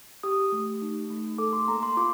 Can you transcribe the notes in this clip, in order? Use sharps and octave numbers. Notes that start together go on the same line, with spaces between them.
G4 D#6
A3
D#4
A3
A4 D6
C6
A#3 A#5
C6
F4 D6